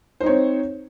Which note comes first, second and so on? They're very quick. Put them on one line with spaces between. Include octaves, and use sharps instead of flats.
C5 D#4 C#5 C4